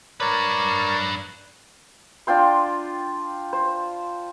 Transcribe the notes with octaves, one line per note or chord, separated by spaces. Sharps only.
D4 A#4 B4 C#5 D5
D4 F4 G5 C6
C5